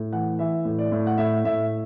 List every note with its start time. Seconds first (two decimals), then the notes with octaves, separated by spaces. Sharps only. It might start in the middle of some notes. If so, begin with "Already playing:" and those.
Already playing: A2
0.13 E3 F#5
0.39 E3 E5
0.65 A2
0.79 D5
0.92 A2
1.07 F#5
1.18 A2 E5
1.44 A2 E5